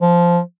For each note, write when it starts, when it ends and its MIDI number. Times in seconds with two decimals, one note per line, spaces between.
0.02 0.39 53